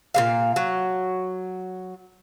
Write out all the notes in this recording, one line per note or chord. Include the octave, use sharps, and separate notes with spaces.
A#2 G#3 F5
F#3